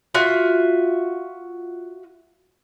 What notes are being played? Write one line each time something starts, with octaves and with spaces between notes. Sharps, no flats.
F4 F#4 E5